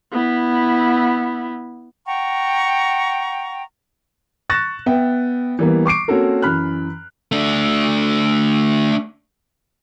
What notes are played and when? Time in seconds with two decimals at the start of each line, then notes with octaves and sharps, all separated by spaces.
0.12 B3 E4
2.06 F#5 G5 A#5 C#6
4.50 C#6 F#6 A6 A#6 E7
4.86 B3 E5 G5
5.59 E3 G3 A#3 B3
5.86 C#6 D6 C7 D7
6.08 A#3 C4 C#4 F#4 A4 A#4
6.42 F#2 E3 B5 F6 F#6
7.32 A3 D4